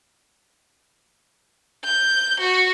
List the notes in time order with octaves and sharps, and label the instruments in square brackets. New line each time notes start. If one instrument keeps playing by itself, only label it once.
[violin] G6
F#4